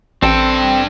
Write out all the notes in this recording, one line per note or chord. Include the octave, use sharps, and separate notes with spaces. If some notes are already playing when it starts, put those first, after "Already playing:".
A1 C4 D4 A4 G5